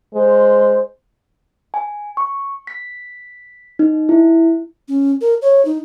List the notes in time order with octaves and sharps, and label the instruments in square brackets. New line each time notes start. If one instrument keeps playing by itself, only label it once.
[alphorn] G#3 [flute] C5
[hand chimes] G#5
C#6
B6
D#4
E4
[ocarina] C#4
A#4
C#5
D#4